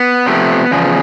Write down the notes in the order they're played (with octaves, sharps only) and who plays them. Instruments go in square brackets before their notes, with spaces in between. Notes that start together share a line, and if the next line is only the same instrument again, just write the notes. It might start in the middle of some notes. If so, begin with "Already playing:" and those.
Already playing: [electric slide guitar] B3
C3 F3 A3
E2 C#3 F3